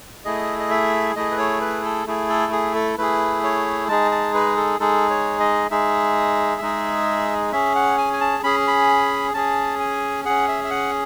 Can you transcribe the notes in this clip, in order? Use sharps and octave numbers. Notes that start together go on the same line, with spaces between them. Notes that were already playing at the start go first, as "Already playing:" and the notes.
A3 E4 G#4 D#5
D#5
E5
A3 E4 G#4 D#5
B4
C#5
B4
A4
A3 E4 G#4
A4
G#4
A4
A3 E4 G#4 B4
C#5
G#3 D#4 G#4 A5
A5
B4
A4
G#3 D#4 G#4 A4
C#5
D#5
G#3 D#4 G#4 E5
G#3 D#4 G#4
C#4 G#4 E5
F#5
G#5
G#5
A5
C#4 G#4 B5
B5
C#4 G#4 A5
G#5
C#4 G#4 F#5
E5
E5
F#5